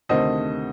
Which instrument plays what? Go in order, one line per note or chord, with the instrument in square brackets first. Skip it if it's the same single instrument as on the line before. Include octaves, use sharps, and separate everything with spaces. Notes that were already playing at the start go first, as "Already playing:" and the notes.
[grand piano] D2 C3 D#3 A3 C5 D#5